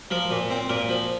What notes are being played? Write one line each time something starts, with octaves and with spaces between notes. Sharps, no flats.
F3 A#4
A#2
C4
A#2 A#4
F3